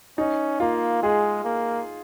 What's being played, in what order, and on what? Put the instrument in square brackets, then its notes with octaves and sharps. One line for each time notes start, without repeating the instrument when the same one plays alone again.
[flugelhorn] C#4 [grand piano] D#4
[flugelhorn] A#3 [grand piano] F4
[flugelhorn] G#3 [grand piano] G#4
[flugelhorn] A#3